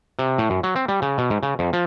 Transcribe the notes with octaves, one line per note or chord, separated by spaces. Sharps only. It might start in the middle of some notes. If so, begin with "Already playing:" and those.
C3
A2
F#2
F#3
C4
G3
C#3
B2
G#2
C#3
F2
F3